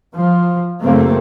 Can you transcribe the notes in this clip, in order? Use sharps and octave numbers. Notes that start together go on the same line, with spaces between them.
F3
F#1 A3 A#3 C4